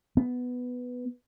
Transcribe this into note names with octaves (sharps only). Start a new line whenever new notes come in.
B3